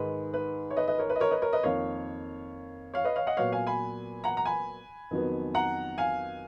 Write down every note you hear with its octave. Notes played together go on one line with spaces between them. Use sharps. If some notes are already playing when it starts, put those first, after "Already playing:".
Already playing: G#2 D#3 G#3 B4
B4
C#5
B4 D#5
B4 D#5
A#4 C#5
B4
D#5
A#4 C#5
B4 D#5
A#4 C#5
B4 D#5
F2 D#3 A#3 C#5 F5
C#5 F5
B4 D#5
C#5 F5
D#5 F#5
A#2 F#3 B3 C#5 F5
F5 G#5
G#5 B5
F#5 A#5
A#5
G#5 B5
F2 D#3 F#3 B3
F#5 A#5
F5 G#5